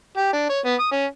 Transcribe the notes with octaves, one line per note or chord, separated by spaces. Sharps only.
G4
D4
C#5
B3
D#6
C#4